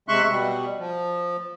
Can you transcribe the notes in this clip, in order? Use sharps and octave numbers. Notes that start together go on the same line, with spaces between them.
C3 G#3 E5 C6 C#6 F#6
B2 G3
F3